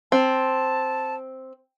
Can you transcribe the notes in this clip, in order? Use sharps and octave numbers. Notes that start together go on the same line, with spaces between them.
C4 A5